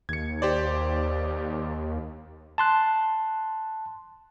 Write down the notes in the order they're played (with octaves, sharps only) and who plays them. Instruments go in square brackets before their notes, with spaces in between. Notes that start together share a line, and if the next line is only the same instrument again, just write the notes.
[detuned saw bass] D#2 [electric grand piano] G#6 C#7
[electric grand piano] G4 C5 D5
[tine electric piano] A5 C6 F#6